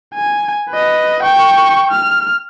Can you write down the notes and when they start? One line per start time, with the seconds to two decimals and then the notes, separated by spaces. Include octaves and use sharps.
0.15 G#5
0.70 B4 D#5
1.23 G5 C#6
1.91 F6